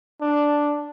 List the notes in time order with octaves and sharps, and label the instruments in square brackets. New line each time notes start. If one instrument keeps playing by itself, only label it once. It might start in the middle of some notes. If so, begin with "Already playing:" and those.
[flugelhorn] D4